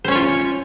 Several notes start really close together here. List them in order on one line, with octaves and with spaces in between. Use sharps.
C5 C#4 C#5 F4